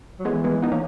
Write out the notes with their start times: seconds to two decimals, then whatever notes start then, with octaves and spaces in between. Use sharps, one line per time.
0.20 F#3
0.25 E3 G#3 B3
0.44 G#3 B3
0.62 E3 B3 D#4
0.72 A#3 C#4